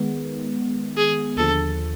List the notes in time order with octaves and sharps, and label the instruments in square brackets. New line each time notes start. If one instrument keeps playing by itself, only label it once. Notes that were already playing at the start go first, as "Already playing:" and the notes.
Already playing: [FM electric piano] D#3 G#3 B3
[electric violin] G#4
[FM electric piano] D#2 D3 F3 [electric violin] A4